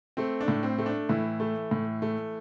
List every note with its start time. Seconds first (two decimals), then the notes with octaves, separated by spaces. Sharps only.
0.17 A3 C4
0.41 D4
0.48 A2
0.63 C4
0.78 A3
0.86 D4
1.09 A2 E3 E4
1.40 A3
1.71 A2
2.02 A3